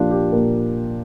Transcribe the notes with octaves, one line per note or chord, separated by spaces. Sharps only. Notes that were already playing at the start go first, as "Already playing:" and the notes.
Already playing: A#2 F3 A#3 D4 F4 G4
G4
A#2 A#4